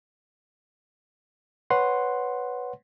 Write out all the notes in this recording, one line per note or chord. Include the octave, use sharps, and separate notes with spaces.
B4 C#5 F#5 C6